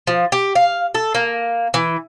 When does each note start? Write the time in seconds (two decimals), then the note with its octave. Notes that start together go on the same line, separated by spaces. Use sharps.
0.07 F3
0.32 G4
0.55 F5
0.95 A4
1.15 A#3
1.74 E3